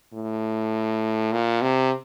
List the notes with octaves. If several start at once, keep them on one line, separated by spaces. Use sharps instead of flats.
A2
A#2
C3